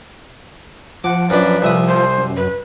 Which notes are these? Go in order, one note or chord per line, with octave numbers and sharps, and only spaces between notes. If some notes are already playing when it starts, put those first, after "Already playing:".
F3 F#5 D6
F#2 D4 B4
C2 E5 D#6
C5
F#2
B4